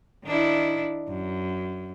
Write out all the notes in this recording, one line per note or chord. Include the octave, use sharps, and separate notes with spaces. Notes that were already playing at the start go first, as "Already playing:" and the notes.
D#3 D4 E4
F#2